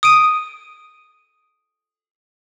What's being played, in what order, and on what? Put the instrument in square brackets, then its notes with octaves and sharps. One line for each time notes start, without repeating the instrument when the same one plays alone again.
[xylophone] D#6 D7 D#7